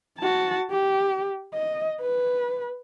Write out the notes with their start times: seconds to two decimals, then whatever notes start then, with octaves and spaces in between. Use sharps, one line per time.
0.19 F#4 A5
0.71 G4
1.54 D#5
2.01 B4